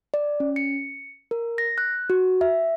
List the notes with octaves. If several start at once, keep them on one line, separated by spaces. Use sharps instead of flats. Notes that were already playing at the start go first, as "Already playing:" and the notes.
D5
C#4
C#7
A#4
A#6
F#6
F#4
E5